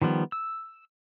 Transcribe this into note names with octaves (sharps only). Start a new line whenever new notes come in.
D#3 F3 G3 B3
E6